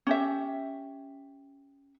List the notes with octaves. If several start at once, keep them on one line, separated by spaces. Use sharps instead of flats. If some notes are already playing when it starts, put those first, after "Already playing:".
C#4 G4 E5